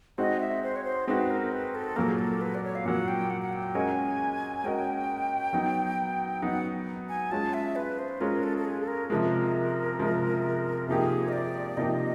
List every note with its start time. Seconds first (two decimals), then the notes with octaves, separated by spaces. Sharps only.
0.18 G#3 C4 D#4 F#4 D#5
0.40 E5
0.63 C5
0.76 C#5
0.84 C5
1.07 G#3 C4 D#4 F#4 B4
1.30 A#4
1.52 B4
1.75 A4
1.96 A#2 F#3 A#3 A#4
2.08 G#4
2.19 A4
2.41 B4
2.55 D5
2.64 C#5
2.75 F5
2.85 A#2 F#3 A#3 F#5
3.08 G5
3.30 F#5
3.42 F#5
3.52 G5
3.75 G#3 C#4 F#4 A#4 D#5 G#5
4.64 G#3 C#4 F#4 A#4 D#5 G5
5.53 F#3 B3 D#4
6.42 F#3 B3 D#4 F#5
7.09 G#5
7.31 G#3 C#4 F4 A5
7.54 E5
7.76 B4
7.99 C5
8.20 G#3 C#4 F4 A#4
8.43 A4
8.57 A4
8.65 G#4
8.81 A4
8.88 A#4
9.09 C3 F3 G#3 A#4
9.99 C3 F3 G#3
10.88 C3 F3 A#3 D#4 G4 G#4
11.28 D#5
11.33 D5
11.77 C3 F3 A#3 D#4 G4 D#5